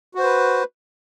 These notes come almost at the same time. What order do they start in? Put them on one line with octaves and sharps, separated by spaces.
F#4 C5 B4